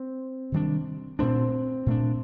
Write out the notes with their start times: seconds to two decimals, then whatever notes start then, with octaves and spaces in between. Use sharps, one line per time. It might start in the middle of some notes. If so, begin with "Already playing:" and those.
Already playing: C4
0.52 C3 D#3 G3 D4
1.19 A#2 A3 C4 D4
1.86 A#2 A3 D4